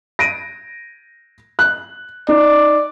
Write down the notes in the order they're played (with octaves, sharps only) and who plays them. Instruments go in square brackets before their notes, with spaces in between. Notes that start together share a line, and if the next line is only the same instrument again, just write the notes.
[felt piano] A#6 D7 D#7
F#6
[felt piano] D#4 [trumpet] D5